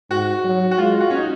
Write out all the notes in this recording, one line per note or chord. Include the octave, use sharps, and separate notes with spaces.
G#2 F#4
F#3
F#4
G#3 F4
F#4
C#4
D#4